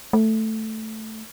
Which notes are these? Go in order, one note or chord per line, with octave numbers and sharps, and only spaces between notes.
A3